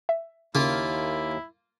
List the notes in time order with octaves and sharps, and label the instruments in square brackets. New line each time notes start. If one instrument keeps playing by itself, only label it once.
[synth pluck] E5
[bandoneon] D#2 [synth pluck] C#3 C#4 [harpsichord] A#3 F4 [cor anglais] E4